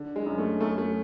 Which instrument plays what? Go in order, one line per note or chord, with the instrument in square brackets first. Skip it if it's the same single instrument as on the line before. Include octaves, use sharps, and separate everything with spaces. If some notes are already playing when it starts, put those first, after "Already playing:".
Already playing: [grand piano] D3
G#3
F#2
A3
F#2 A3
A3